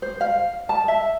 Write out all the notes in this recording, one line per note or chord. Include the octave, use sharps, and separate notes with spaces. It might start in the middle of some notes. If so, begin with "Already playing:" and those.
C5
F5
A5
E5